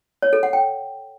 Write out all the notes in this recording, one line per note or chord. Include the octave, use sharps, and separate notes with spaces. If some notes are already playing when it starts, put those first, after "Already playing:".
C#5
A4
F#5
G5